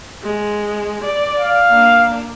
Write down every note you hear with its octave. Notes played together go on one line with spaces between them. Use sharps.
G#3
D5
F5
A#3 D4